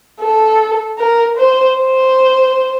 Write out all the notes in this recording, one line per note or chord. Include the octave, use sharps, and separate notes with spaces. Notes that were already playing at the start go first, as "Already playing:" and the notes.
A4
A#4
C5
C5